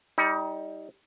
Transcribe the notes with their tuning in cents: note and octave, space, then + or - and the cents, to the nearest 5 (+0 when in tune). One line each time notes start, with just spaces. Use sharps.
G3 +0 D#4 +25